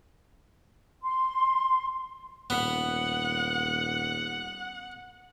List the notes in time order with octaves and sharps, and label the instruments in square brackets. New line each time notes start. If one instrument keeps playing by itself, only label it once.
[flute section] C6
[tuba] D#1 [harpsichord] B3 [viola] F#5